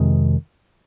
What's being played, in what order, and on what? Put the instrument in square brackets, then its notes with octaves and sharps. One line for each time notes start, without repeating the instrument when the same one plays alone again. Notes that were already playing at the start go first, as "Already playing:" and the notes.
Already playing: [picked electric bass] F2 C3 D#3 G#3